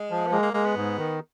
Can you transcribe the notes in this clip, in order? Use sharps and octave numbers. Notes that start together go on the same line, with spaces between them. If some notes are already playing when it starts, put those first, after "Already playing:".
Already playing: G#3
F3
B3
G#3 A#3
A#3
G#3 A#3
B3
G#2
D#3